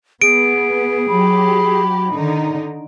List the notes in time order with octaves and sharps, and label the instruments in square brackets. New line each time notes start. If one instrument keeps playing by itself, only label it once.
[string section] B3 [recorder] G#4 [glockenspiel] D7
[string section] F#3 G4 [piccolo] B5
[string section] D3 D#3 D#4